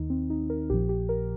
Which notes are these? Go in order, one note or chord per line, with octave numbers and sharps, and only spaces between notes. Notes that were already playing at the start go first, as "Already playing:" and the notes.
Already playing: D#2 D#3 D#4
C4
D#4
A#4
A#1 A#2 F3 G4
G4
A#4